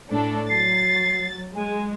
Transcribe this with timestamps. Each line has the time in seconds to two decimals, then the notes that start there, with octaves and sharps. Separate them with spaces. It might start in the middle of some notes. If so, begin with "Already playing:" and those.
0.10 A2 D4 A4
0.50 F#3 A6 C7
1.55 G#3 G#5